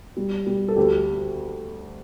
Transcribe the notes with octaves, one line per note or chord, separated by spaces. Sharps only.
G3
G3
A4
D2 G4